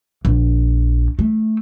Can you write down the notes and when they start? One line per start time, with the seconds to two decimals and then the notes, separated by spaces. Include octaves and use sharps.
0.25 A#1
1.19 A3